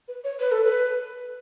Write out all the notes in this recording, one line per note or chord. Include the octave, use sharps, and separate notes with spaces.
B4
C#5
B4
A4
B4